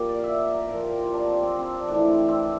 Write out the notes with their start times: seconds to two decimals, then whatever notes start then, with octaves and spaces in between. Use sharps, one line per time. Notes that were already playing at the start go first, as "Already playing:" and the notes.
Already playing: A#2 F3 G4 A#4
0.09 D5
0.19 E5 F5
0.54 A#4
0.69 A#2 F3 A#4
0.83 G4
0.98 F4
1.13 D4
1.28 C4
1.43 C4
1.59 C4
1.74 D4
1.88 A2 E3 D4
2.08 C4
2.28 C4